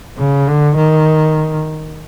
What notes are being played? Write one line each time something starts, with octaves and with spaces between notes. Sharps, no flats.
C#3
D3
D#3